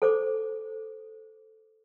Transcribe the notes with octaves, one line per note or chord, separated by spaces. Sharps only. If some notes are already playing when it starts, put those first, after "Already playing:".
A4 C5 D6